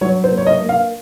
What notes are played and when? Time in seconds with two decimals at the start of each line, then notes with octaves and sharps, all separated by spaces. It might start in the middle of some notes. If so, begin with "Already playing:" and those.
0.01 F#3 C#5
0.24 C5
0.31 A#3
0.38 C#5
0.47 D#5
0.61 A#3
0.69 F5